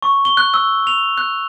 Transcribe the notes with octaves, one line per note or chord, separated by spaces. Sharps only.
C#6
G7
F#6
E6
F7
F#6